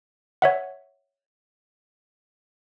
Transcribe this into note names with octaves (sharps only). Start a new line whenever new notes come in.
C#5 E5 F#5